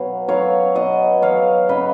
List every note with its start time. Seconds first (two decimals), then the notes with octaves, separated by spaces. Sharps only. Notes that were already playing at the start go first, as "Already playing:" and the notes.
Already playing: B2 F#3 C#5 F5
0.28 F#3 C#5 F5
0.75 B2 D#5 F#5
1.22 F#3 C#5 F5
1.69 C#3 B4 D#5